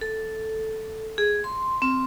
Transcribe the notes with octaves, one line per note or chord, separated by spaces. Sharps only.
A4
G#4
C6
C4